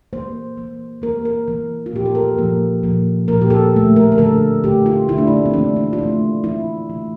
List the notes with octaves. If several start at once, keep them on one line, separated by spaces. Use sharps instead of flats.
E3 A#3 C5
E3 A#3
E3 A#3 A#4
A#4
E3 A#3
F4
A#2 F3 A#3 G4
A4
A#4
A#2 F3 A#3
A#2 F3 A#3
A#2 F3 A#3 A#4
G4
A4
D3 A3
A#4
A#4
D3 A3 A4
D3 A3 G4
F4
D3 A3 E4
D4
E4
A#3
C4
E3 A3 D4
D4
F4
E3 A3 E4
E3 A3 E4
E3 A3